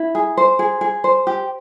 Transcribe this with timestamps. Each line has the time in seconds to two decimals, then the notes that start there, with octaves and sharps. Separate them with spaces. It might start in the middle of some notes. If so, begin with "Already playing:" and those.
Already playing: E4
0.15 G#4
0.37 C5
0.59 G#4
0.81 G#4
1.04 C5
1.27 G4